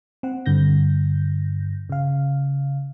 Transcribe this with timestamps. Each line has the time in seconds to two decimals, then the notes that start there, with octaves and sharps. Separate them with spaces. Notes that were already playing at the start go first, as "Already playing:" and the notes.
0.23 C4 F#5
0.46 G2 D3 G6 A#6
1.90 C#3 F5